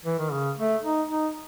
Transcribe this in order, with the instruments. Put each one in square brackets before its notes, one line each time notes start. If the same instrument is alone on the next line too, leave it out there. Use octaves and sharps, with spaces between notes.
[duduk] E3
D#3
C#3
A3
D#4
D#4